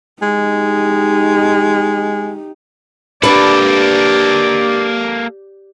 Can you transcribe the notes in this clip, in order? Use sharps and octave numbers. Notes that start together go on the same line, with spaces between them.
G#3 D#4 G4
A#3 D4 G4 A4 B4 D5